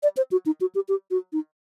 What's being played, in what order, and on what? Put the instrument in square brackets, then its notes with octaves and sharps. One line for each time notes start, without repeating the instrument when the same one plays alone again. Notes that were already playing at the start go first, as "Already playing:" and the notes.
[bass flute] D5
C5
F#4
D#4
F#4
G4
G4
F#4
D#4